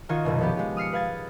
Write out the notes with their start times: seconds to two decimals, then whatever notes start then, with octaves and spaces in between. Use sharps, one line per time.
0.09 D#3 F4 F#4 D#5 G#6
0.25 F#1 C2 B2
0.39 F3 B3 G4
0.57 G#3 G4
0.77 D#6 F6 C7 C#7
0.93 B4 F5 G#6 A6